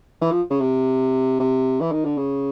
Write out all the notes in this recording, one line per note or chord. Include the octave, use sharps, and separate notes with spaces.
E3
F3
C#3
C3
C3
E3
D#3
D3
C#3